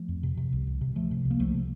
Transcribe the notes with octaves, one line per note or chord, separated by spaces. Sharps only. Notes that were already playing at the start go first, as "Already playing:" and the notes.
Already playing: F3 A3
F2
C3
C3
C2
C2
C3
C3 F3 A3
C3
C2
A#3
C2 F3 A3
C3